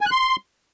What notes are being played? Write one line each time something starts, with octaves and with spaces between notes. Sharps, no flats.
G#5
F#6
C6